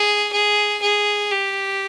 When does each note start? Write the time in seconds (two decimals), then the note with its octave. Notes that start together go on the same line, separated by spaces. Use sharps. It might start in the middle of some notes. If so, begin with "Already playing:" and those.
Already playing: G#4
0.33 G#4
0.82 G#4
1.31 G4